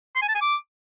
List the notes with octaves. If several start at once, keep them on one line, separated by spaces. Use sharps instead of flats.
C6
G#5
A5
G#5
D6